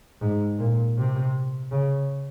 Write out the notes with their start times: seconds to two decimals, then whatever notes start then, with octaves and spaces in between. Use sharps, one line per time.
0.21 G#2
0.59 A#2
0.97 C3
1.72 C#3